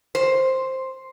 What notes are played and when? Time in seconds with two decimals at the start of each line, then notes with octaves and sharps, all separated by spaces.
0.15 C5